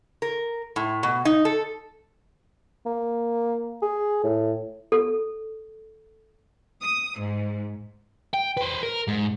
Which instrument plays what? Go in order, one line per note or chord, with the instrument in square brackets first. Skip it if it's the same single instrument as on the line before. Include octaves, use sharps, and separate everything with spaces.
[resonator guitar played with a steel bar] A#4
A2
B2
D#4
A4
[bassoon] A#3
G#4
A2
[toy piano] A4
[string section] D#6
G#2
[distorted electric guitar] G5
B4 C5
A#4
G#2